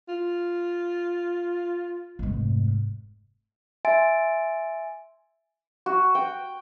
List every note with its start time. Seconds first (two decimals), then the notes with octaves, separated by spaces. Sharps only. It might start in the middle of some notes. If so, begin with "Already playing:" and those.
0.08 F4
2.19 F1 G#2
3.85 E5 G#5 C6 A6 D7
5.86 F#4
6.15 G5